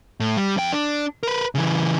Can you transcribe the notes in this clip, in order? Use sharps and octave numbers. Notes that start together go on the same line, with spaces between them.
A2
G3
F2 G5
D4
A#4 B4
C#3 E3